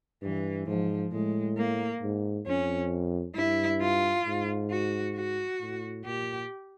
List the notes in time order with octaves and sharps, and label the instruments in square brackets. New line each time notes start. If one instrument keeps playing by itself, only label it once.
[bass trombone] G2 [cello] E3
[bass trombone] G#2 [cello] F3
[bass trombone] A2 [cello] G#3
[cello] A#3
[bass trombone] G#2
[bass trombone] F2 [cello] C#4
[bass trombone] G2 [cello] E4
[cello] F4
[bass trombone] G#2
[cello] F#4
F#4
[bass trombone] A2
[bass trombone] A#2 [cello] G4